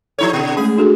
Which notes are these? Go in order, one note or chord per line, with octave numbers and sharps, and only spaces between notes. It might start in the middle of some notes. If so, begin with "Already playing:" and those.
F3 D#4 E4 A4 C#5
B2 D3
G#3 A3 C#4 G#4
D4 F#4 A4